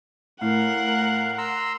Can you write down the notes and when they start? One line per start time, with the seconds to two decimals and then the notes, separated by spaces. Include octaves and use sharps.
0.41 A2 A#4 F5 F#5
1.38 A#5 C6 E6